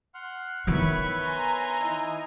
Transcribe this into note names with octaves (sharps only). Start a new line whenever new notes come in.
F#5 C6 F6
D#3 B3 E4 B4 C#5 E5 B5 C#6
G#5 A#5 C6
D#4 E4 D#5